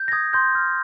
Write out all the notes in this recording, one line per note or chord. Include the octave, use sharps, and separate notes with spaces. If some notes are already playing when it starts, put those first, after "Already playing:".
Already playing: G6
A#6
D#6 G#6
C6 G6 A#6
F6